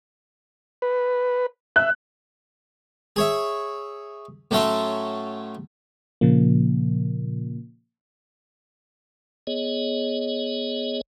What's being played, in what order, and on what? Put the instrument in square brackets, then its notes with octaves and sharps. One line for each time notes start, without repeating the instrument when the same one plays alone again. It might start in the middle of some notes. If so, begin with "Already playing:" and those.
[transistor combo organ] B4
[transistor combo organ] E5 [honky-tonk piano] F#6
[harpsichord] G#4 C#5 E5
A2 F#3 A3 C#4 E5 C6
[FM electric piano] A#2 C#3 F3 A#3
[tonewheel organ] B3 G#4 C#5 D#5